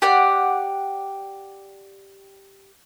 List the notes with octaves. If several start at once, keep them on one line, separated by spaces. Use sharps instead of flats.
G4 D5 F#5